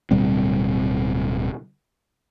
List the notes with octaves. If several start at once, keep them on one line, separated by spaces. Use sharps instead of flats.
D1 B2 G3 C4